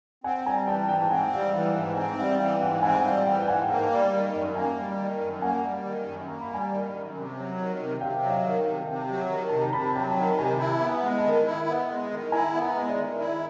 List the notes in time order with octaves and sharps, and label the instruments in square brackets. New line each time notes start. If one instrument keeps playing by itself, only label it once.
[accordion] C4 [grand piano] F#5 G#5
[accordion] G3 [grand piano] G#5 A#5
[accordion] E3 [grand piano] G5 A5
[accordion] G#2 [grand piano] G5 A5
[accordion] C4 [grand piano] F#5 G#5
[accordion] G3 [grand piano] F5 G5
[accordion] E3 [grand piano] E5 F#5
[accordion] G#2 [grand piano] F#5 G#5
[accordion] C4 [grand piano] G#5 A#5
[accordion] G3 [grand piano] E5 F#5
[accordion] E3 [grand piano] F5 G5
[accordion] G#2 [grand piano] E5 F#5
[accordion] C4 [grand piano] F#5 G#5
[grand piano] G#5
[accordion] G3 [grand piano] F5 G5
[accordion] E3 [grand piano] F5 G5
[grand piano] G5
[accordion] G#2 [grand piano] F#5 G#5
[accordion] A#3 [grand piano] G5 A5
[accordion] G3
D#3
F#2
[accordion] A#3 [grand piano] G#5 A#5
[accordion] G3
D#3
F#2
[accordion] A#3 [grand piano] F#5 G#5
[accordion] G3
D#3
F#2
[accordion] A#3 [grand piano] A#5
[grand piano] B5
[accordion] G3 [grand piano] G#5 A#5
[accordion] D#3
F#2
C3
F#3
D#3
C3
[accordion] C3 [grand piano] F5 G5
[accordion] F#3
[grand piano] D#5 F5
[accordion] D#3
[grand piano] F5 G5
[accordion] C3
[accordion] C3 [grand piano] G5 A5
[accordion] F#3
D#3
[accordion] C3 [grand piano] A5
[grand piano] A#5
[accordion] C3 [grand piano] A5 B5
[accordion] F#3 [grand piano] G5 A5
[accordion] D#3
[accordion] C3 [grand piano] G#5 A#5
[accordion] E4 [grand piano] A5 B5
[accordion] B3
[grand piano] G#5 A#5
[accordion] G#3
[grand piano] A5 B5
[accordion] D#3
E4
B3
G#3
D#3
[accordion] E4 [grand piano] G#5 A#5
[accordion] B3
[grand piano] G#5 A#5
[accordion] G#3
[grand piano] D5 E5
[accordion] D#3
[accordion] E4 [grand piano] D5 E5